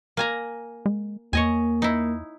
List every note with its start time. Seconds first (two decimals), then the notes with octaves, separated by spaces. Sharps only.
0.17 A#3 G#5 A#5
0.86 G#3
1.33 E2 A#3 C#5 D#5 G#5
1.82 D#4 E4